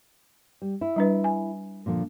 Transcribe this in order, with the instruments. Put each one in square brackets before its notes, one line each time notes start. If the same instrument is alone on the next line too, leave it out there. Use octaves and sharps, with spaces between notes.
[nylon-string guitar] G3
E4
[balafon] G3 D4 B4
G#5
[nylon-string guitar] A#2 D3 F3